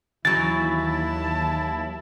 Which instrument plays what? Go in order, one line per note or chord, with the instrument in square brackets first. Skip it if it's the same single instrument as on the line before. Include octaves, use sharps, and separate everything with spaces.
[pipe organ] D#2 E4 [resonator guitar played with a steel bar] E3 F#3 [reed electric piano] A6
[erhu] A5